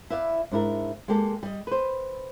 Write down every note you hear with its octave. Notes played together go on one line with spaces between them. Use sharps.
E4 B4 D5 F5
G#2 D4 E4 A#4
G#3 A#3 G4 A4
G3 D#5
B4 C5